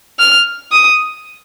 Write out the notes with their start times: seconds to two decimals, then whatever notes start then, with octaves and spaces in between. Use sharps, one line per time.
0.19 F6
0.72 D#6